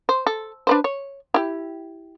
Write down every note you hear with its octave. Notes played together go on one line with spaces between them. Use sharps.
C5
A4
D4 B4 C5
C#5
E4 G4